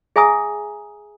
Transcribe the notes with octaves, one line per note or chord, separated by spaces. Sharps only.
G#4 E5 G#5 A#5 D#6